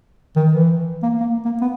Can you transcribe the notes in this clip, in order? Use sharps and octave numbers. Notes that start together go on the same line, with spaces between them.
D#3
E3
A#3
A#3
A#3
B3